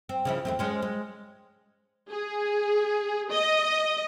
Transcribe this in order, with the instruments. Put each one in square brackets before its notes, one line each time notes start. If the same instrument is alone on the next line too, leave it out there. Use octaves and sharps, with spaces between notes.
[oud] C4
C#3 F3 E4
D#2 A3 C4
G#3 C#4 C5
G#3
[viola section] G#4
D#5